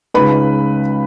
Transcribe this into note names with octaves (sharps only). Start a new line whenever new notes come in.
C#2 C#3 G#3 D#4 B4 B5